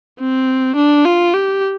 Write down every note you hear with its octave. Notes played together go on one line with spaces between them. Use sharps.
C4
D4
F4
G4